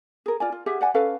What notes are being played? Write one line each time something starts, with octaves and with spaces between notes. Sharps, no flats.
G#4 A#4
F4 D5 G#5
F4
G4 G#4 E5 F#5
D5 F#5 G#5
C#4 A4 B4 F5